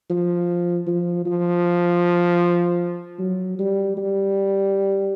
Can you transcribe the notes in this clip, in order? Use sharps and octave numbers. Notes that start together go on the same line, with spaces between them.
F3
F3
F3
F#3
G3
G3